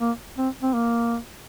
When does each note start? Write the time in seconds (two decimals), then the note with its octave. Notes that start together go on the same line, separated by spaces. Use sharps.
0.01 A#3
0.38 C4
0.62 C4
0.74 A#3